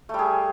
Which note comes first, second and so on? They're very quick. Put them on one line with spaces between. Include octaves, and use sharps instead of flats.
A3 G3 G#4